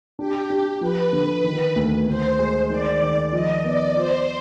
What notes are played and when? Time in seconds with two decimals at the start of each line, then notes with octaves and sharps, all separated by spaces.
0.18 D4 G4
0.50 D4
0.81 F3 B4
1.13 D3
1.44 D#3
1.76 D2
2.07 D2 C5
2.39 G#3
2.70 D#3 D5
3.02 D#3
3.33 F3 D#5
3.64 B3 D5
3.96 F4 C5